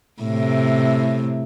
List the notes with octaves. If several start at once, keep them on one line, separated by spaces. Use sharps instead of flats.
A2 C3